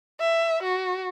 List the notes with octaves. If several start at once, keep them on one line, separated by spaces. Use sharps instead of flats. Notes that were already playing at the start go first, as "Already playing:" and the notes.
E5
F#4